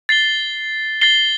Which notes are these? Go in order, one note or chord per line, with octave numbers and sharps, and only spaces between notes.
A6 C7 G7
A6 C7 G7